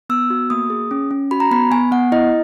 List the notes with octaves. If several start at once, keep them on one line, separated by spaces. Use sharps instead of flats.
B3 E6
F#4
A#3 D#6
G#4
C#4
C#4
F#4 B5
A#5
B3 B5
B3 G#5
B3 F#5
E4 D#5